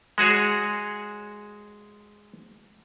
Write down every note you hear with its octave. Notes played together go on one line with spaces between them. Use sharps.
G#3 F#4 G#4 C#5